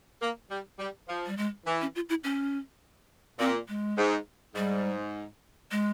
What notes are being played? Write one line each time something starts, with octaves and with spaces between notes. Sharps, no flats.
A#3
G3
G3
F3
G3
G#3
E3
C#4
F4
E4
C#4
A#2 C4
G#3
G#2
G#2 G3
G#3